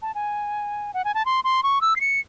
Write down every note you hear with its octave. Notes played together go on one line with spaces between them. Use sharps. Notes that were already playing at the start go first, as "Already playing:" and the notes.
A5
G#5
F#5
G#5
A5
C6
C6
C#6
E6
C7
C#7